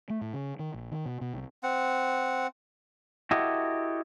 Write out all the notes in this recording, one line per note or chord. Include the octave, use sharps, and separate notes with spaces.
A3
A2
C#3
D#3
A#1
D#3
B2
B2
C2
C4 F#5
E4 F#4 G4 A4 D#5